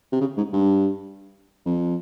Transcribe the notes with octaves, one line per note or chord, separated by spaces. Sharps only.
C3
C#3
G#2
G2
F2